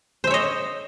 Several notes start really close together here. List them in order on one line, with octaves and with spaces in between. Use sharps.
C5 E5 C#5 D#5